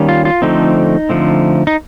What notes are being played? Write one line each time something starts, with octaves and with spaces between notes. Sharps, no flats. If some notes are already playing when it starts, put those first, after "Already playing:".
Already playing: D#3 G3 A#3 C#4
F4
F4
D3 F3 A3 C4 D#4
D3 F3 A3 C4
D#4